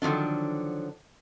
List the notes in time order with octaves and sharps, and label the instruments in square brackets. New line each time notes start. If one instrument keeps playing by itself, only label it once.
[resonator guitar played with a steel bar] D3 D#3 F3 F#3 D4